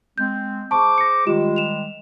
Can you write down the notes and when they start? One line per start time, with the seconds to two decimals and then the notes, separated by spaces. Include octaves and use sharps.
0.18 G#3 C4 G6
0.71 G#4 C5 A5 C#6 D6
0.98 A#6 C#7
1.27 D#3 G3 G#3 F4 G4 E7
1.56 E7 F7